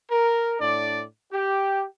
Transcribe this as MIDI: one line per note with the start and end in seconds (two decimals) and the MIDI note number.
0.11 0.55 70
0.60 1.04 45
0.60 1.04 62
0.60 1.04 74
1.33 1.85 67